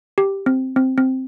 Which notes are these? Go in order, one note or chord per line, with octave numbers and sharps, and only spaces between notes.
G4
C4
C4
C4